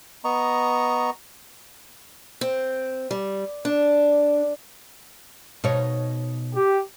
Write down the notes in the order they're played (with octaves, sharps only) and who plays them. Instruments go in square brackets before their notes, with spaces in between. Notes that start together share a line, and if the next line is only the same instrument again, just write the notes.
[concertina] B3 D#5 A#5 C#6
[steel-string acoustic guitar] C4
G3
D4
[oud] B2 D#4 C#5
[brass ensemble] G4